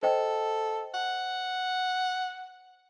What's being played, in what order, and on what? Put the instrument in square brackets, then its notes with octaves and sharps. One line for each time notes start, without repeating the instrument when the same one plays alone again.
[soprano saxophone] A4 [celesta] C5 D#5 G5
[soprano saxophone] F#5